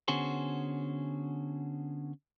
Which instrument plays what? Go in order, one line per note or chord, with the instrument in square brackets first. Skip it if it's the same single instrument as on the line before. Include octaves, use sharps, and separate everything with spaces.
[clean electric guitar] D3 B3 C#4 F#4 G#4 C5